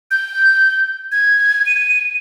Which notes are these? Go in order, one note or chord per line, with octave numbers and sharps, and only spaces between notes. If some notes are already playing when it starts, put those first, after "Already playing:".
G6
G#6
D#7